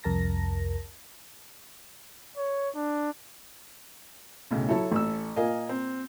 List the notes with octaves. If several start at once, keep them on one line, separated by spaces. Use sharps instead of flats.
C2 F2 A#4 A5 A#6
C#5
D4
B1 A2 C#3
F#3 E4 A4 C#5 A5
A1 E6
A#2 A#4 D#5 F5 G#5
C4